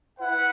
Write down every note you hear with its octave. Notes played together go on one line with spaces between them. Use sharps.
E4 B4 F#5